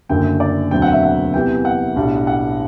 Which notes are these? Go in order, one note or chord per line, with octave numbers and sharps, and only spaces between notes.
F#1 F#2 D3 A3 G5
D5
E1 D2 D3 F#3 C4 G5
F#5
E5
F#5
E2 C3 E3 G3 G5
F#5
B1 A2 G3 D4
F#5